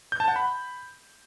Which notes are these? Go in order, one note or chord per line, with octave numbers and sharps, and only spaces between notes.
G6
A5
F#5
B5